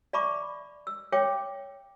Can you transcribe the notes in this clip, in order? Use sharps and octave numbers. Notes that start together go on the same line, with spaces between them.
D5 E5 A5 B5 C#6 D6
E6
C#5 E5 G5 D6